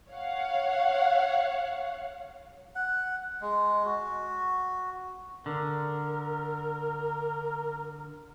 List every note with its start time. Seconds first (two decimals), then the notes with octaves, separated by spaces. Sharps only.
0.10 C#5 F5 F#5
2.75 F#5
3.41 G#3
3.85 F#4
5.46 D3 A#4